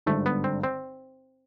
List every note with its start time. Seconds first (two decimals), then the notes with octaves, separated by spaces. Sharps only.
0.06 G#1 G2 D3 A3
0.26 B3
0.44 C4
0.64 C4